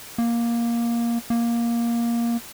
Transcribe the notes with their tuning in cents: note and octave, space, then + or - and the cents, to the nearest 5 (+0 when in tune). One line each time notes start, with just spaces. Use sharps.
A#3 +10
A#3 +10